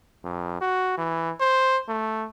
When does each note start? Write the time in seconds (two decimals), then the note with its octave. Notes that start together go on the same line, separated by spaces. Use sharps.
0.24 F2
0.61 F#4
0.98 E3
1.40 C5
1.89 A3